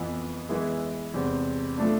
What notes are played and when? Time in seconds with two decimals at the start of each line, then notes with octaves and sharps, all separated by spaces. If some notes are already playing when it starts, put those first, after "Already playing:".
Already playing: F2 E3 B3
0.49 E3 G#3 B3 E4 G#4
1.14 E2 C3 G#3 C4
1.78 F3 A3 D4